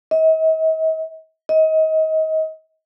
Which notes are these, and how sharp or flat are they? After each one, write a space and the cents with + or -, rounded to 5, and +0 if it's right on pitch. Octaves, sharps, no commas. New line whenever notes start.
D#5 +45
D#5 +30